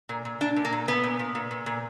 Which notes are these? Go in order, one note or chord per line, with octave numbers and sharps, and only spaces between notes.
A#2
A#2
A#2 D4
A#2
A#3
A#2
A#2 B3
A#2
A#2
A#2
A#2
A#2